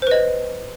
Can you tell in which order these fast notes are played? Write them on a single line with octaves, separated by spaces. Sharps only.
C5 B4 D#5